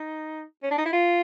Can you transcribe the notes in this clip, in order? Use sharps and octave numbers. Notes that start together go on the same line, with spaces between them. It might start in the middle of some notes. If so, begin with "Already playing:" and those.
Already playing: D#4
C#4
D4
D#4
E4
F4